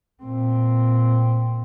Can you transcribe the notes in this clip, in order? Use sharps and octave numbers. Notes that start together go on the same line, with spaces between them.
A#2 C4